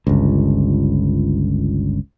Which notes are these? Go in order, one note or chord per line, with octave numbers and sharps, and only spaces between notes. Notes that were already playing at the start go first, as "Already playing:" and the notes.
G1 C#2